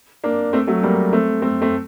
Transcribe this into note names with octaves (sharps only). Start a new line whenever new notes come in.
A#3 D4
A3 C4
F#3 A3
G3 A#3
A3 C4
A3 C4
A3 C4